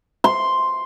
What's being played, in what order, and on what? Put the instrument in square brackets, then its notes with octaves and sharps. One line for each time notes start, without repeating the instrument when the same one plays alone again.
[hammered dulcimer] C6